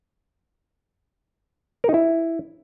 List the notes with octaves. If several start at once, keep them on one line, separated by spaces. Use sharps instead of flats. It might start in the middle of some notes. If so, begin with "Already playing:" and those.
A#4
D#4
E4